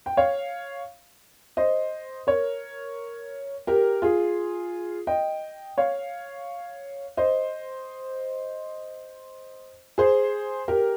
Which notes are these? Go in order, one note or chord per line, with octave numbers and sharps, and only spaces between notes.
G5
C#5 F5
C5 D#5
A#4 C#5
G4 A#4
F4 G#4
D#5 G5
C#5 F5
C5 D#5
G#4 C5
G4 A#4